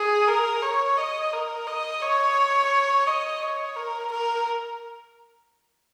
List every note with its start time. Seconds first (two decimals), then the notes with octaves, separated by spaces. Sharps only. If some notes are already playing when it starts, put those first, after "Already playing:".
Already playing: G#4
0.28 A#4
0.62 C#5
0.97 D#5
1.33 A#4
1.67 D#5
2.02 C#5
3.06 D#5
3.42 C#5
3.76 A#4
4.12 A#4